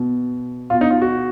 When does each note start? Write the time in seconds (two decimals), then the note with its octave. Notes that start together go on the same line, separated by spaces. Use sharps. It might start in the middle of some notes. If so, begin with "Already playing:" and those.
Already playing: B2
0.70 B2 F4
0.81 D#4
0.90 F4
1.02 F#4